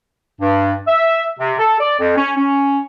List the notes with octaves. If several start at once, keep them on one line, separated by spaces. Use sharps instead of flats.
G2
E5
C3
A4
D5
F2
C#4
C#4